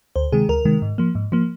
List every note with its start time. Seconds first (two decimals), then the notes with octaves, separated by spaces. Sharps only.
0.16 D2 C5
0.32 C3 D#3 G#3 G#4
0.49 D2 A#4
0.65 C3 D#3 G#3
0.82 G#2
0.98 F3 A#3
1.15 G#2
1.32 F3 A#3